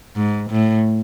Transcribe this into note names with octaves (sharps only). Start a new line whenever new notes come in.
G#2
A2